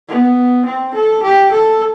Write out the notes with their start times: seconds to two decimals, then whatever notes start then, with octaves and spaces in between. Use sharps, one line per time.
0.09 B3
0.66 C4
0.94 A4
1.23 G4
1.52 A4